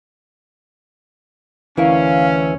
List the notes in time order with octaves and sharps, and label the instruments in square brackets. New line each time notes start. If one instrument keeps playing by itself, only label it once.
[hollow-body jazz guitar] D2 E4 A#4 [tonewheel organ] E3 [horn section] C#4 [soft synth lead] F5